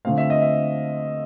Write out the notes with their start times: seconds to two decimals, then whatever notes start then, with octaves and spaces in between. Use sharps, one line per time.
0.05 D3 F3 A3 C4 F5
0.18 E5
0.30 D#5
0.42 E5